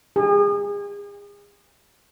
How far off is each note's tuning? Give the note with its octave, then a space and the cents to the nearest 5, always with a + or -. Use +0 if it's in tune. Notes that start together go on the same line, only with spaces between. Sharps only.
G#4 -40